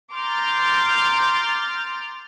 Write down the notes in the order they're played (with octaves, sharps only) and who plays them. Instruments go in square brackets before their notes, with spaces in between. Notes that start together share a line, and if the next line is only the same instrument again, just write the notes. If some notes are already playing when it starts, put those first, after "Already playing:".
[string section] A#5 C6 D6 F6 G6 A6